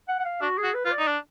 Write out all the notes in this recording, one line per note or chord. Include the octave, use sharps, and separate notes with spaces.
F#5
F#5
F5
D4 F#4
G#4
F#4
B4
F4 B4
D5
D#4
D4